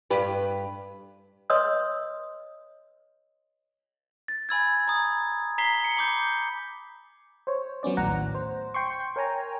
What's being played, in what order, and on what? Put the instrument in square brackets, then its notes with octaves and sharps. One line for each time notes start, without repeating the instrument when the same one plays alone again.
[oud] G2 G4 B4
[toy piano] B4 C#5 D#5 C6 D#6 E6
[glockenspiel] A6
G#5 B5 E6 G#6
A#5 D#6
A#5 B6 C7 G7
C#7
B5 D6 G6
[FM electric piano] C5 C#5
F#3 B3 C#4 D5
A#1 D#2 A2 F#5 A#5
C5
G5 C6 C#6
A#4 C#5 G5 G#5 A#5